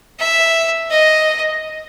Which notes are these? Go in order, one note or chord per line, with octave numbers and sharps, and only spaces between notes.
E5
D#5